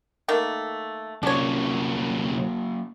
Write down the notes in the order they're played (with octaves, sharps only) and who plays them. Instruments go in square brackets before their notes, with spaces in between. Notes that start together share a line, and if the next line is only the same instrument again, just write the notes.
[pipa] D#3 A3 A#3
[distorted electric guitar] C2 C#4 [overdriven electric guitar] F#3 A#3 [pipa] D4 C#5